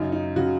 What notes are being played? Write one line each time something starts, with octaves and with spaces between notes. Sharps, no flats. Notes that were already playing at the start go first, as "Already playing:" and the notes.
Already playing: F#2 C#3 D#4
D#4
C#3 F#4